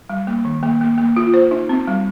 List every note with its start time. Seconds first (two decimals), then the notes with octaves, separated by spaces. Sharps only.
0.10 G3
0.27 A#3
0.45 D#3
0.63 A#3
0.81 A#3
0.98 A#3
1.16 F4
1.34 C5
1.51 D#4
1.69 C4
1.87 G3